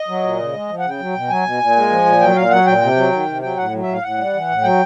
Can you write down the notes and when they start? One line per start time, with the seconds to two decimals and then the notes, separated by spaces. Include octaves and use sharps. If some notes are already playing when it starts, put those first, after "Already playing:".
Already playing: D#5
0.08 F#3
0.23 A#2
0.38 C#3
0.53 G#3
0.69 F3
0.79 C#3 F#5
0.89 G5
0.99 F#3
1.15 B2
1.29 F#3 G#5
1.44 B2
1.60 A#2
1.76 G#3
1.90 F3
2.05 A#2
2.21 F#3 G5
2.36 A#2 F5
2.50 F#3 F#5
2.66 A#2 G5
2.81 C3
2.97 F#3
3.12 D#3
3.27 C3
3.42 F#3 G5
3.57 A2 F#5
3.73 F#3
3.83 E5
3.88 A2 F5
4.03 A2 F#5
4.18 G3
4.33 E3
4.49 A2
4.63 F#3 G5